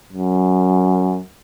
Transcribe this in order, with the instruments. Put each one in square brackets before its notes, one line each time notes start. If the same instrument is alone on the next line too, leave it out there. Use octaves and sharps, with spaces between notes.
[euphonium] F#2